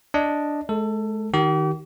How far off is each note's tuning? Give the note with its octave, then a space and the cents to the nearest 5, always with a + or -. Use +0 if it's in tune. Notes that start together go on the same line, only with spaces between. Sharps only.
D4 +0 D#5 +0
G#3 +45 A4 +20
D#3 +0 G4 -40